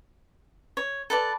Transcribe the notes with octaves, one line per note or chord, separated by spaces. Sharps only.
C#5
A4 B4 D5 A5